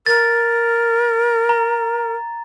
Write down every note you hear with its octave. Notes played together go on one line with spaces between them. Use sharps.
A#4 A6
A#5